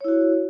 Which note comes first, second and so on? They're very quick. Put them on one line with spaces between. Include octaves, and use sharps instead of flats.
C#5 E4 F#4